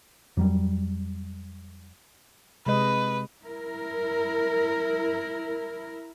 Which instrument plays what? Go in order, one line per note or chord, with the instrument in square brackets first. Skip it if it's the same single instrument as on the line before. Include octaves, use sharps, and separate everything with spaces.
[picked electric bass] F2 F#3 G3
[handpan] C3 G#3 D#5 [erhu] B4
[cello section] E4 A#4